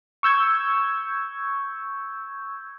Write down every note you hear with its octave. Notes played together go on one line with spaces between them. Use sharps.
C#6 E6 G6 G#6